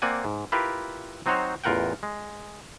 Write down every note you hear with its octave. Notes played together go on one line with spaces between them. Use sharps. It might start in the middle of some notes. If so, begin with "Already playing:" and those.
A#3 C4 D5 F#5 G#5
G#2
E4 F4 G4 A#4 B4
F#3 C4 D#4 F#4 C5 C#5
A1 E2 F4 A#4 F#5 G5
G#3